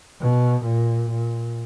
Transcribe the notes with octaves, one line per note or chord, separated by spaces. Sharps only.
B2
A#2
A#2